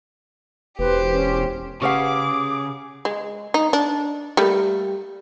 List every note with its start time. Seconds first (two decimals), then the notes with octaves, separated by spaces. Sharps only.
0.79 E1 G4 B4 C5
1.12 C#4
1.82 C#3 G4 G#4 B4 F#5 D6
3.05 G#3
3.54 D#4
3.73 D4
4.37 G3 A3 A#3